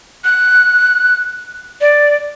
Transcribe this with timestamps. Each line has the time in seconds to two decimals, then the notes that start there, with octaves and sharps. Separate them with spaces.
0.24 F#6
1.81 D5